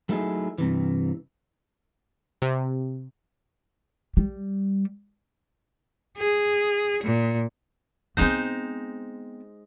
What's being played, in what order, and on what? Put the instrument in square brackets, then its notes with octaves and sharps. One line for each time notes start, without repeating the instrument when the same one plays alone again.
[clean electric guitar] F#3 A3 D#4 E4 G4 G#4
G2 C3 E3
[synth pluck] C3
[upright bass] G3
[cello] G#4
A#2
[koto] G#3 D#4 C5 [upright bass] B3 C4